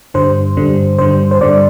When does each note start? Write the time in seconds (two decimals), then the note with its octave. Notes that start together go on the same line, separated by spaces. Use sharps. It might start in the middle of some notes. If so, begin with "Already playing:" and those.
0.14 G2 D3 G3 C5
0.57 G2 D3 G3
0.99 G2 D3 G3 C5
1.31 C5
1.40 G2 D3 G3 D5